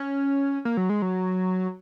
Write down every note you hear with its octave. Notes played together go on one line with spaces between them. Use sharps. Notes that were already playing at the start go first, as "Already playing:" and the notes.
Already playing: C#4
A#3
F#3
G#3
F#3